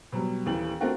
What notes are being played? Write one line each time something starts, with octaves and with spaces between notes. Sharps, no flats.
B2 F#3 G3
D#1 D#2 E3 F#7
A3 C4 D4 F4 F#4 A#4